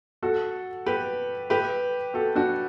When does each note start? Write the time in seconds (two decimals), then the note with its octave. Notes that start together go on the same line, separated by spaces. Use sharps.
0.23 F#4 A4
0.86 G4 B4
1.50 G4 B4
2.14 F#4 A4
2.35 D4 F#4